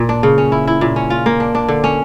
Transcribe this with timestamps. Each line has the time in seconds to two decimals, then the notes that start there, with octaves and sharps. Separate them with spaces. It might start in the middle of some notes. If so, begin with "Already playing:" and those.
Already playing: A#2
0.09 D4
0.23 C#3
0.38 C#4
0.52 E4
0.67 E4
0.81 A#2
0.96 C#4
1.10 F4
1.26 A#3
1.40 D4
1.55 D4
1.68 D3
1.84 C#4